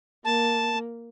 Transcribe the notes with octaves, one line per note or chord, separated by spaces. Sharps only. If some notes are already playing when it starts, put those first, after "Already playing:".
A#3 A5